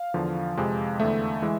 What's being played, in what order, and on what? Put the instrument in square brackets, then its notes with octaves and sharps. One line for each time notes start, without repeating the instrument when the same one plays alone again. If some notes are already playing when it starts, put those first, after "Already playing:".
Already playing: [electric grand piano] F5
E2 D3 F3
F2 C3 G#3
E2 D3 A3 E5
E3 G#3